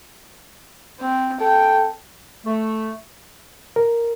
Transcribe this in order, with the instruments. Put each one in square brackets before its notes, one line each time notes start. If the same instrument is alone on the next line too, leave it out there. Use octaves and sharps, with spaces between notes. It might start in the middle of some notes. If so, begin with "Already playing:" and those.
[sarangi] C4
[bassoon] A4 [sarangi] G5
[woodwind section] A3
[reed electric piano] A#4